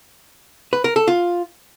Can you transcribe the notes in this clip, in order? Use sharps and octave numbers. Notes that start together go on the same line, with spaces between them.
B4
A#4
A4
F4